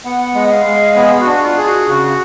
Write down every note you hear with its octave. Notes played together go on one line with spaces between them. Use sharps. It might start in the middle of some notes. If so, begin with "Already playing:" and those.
B3 F#5
G#3
F5
G#3
B3 G#4
F#4
D4
F4
G#4
F#4
C#3 F#4